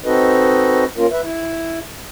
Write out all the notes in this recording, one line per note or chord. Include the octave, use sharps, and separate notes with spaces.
C4 D#4 F#4 A4 B4 D#5
A#3 C#4 F4 A#4
B4 E5
E4